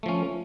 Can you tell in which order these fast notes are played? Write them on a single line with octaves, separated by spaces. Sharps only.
A3 F3 C#4